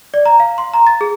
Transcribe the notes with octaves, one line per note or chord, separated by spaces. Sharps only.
D5
A#5
F5
C6
A#5
A6
G#4